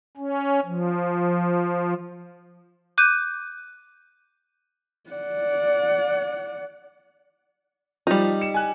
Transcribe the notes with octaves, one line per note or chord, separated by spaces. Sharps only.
C#4
F3
D6 F#6 G6 D#7
D5 F#5
F3 G3 D#4
C#7 E7
G#5 F#6